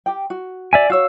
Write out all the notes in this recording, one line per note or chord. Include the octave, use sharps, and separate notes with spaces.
G4 G5
F#4
D5 E5 G#5
F#4 C#5 F5 E6